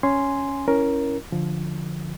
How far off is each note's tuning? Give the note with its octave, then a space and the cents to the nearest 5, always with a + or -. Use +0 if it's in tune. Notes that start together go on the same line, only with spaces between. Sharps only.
C#4 +0 G#5 +0 C6 -5
C#4 +0 E4 +0 A#4 +10
D3 +0 F3 +0